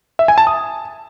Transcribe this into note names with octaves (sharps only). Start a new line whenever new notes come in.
E5
G#5
A5
D#6